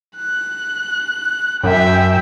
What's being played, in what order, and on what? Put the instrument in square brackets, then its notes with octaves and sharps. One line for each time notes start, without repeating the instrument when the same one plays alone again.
[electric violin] F#6
[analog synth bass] F#2 [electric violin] E5 G5